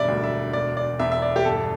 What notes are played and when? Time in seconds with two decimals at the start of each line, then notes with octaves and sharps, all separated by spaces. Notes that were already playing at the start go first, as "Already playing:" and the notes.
Already playing: E1 G2 D5 E5
0.08 D2
0.23 E5
0.53 E1 D5
0.77 D5
0.99 E2 E5
1.12 E5
1.22 D5
1.36 G4
1.45 G1 A4